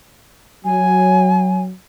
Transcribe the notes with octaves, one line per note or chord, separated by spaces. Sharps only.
F#3 G#5